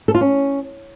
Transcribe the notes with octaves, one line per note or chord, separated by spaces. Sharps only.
A4
F4
C#4